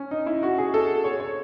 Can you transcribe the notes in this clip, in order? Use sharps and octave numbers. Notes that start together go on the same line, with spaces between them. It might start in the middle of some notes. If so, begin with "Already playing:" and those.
Already playing: C#4
D#4
E4
F#4
G#4
A4
C#5
C#5